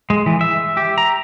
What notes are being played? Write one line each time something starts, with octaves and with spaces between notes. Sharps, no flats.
G#3
E3
E5
G4
A#5